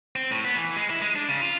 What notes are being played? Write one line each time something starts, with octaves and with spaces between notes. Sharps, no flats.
C4
A2
B3
E3
G#3
E4
G#3
D4
C#3
F4